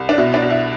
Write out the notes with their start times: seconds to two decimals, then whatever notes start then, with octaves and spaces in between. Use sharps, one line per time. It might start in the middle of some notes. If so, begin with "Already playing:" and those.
Already playing: C2
0.09 D4
0.18 B2 E4
0.34 D4
0.42 B2
0.50 E4